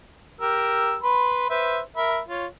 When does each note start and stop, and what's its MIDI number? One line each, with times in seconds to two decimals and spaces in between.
0.41 0.96 67
0.41 0.96 70
0.41 0.96 88
1.02 1.49 71
1.02 1.49 83
1.02 1.49 84
1.50 1.80 71
1.50 1.80 72
1.50 1.80 76
1.96 2.19 70
1.96 2.19 76
1.96 2.19 83
2.29 2.46 65
2.29 2.46 73